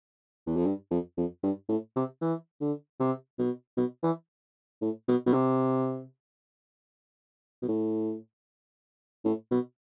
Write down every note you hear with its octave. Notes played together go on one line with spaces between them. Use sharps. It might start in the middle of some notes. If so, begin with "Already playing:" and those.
E2
F2
G2
F2
F2
G2
A2
C3
E3
D3
C3
B2
B2
E3
A2
B2
B2
C3
B2
A2
A2
B2